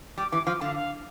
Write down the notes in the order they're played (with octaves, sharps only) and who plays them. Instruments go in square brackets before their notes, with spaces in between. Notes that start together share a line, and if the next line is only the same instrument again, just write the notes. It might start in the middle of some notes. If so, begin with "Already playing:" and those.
[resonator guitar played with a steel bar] G3 [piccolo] D6
[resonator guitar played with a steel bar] E3 [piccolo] D6
[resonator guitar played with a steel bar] F3 [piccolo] D6
[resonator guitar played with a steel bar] D3 [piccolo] F5
[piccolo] F5